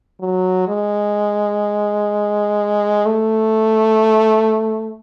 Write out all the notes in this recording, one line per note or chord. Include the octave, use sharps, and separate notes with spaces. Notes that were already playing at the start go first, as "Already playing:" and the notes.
F#3
G#3
A3